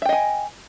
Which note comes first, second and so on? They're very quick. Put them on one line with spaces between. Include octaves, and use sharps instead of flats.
E5 G5 D#5 G#5